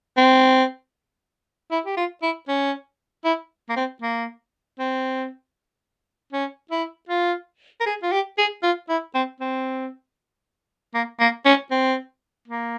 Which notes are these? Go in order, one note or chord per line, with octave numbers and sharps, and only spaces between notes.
C4
E4
G4
F4
E4
C#4
E4
A#3
C4
A#3
C4
C#4
E4
F4
A#4
G#4
F4
G4
G#4
F4
E4
C4
C4
A#3
A#3
C#4
C4
A#3